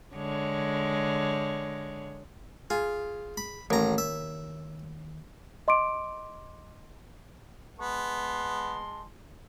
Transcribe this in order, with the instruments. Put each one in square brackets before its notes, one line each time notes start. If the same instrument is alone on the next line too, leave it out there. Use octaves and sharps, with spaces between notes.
[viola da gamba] D3 G#3 C#5
[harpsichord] F4 [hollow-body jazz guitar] G#4
[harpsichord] B5
[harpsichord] A1 A#5 [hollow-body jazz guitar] D#2 A#4 C#5
[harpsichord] E5
[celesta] D#5 C6 D6 D7
[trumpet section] G#3 A5 C6 [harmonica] B3